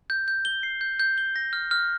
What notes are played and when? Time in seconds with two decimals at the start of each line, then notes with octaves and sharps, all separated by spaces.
0.10 G6
0.28 G6
0.45 G7
0.63 C7
0.81 G6
1.00 G6
1.18 G7
1.36 A#6
1.53 F6
1.71 F6